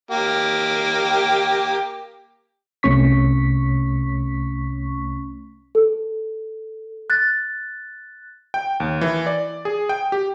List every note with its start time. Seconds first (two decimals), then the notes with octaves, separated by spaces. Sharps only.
0.11 A#3 G4
2.83 C2 C3 A3 C#4 C#6 B6
5.75 A4
7.10 F#6 A6
8.54 G5
8.80 D#2
9.01 E3
9.26 D5
9.65 G#4
9.89 G5
10.12 G4